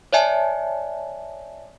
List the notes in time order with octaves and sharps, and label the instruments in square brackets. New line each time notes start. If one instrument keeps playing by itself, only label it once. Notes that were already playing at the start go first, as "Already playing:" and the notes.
[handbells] C#5 D5 E5 G#5 A5